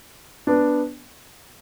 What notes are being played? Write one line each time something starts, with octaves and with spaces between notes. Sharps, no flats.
B3 D4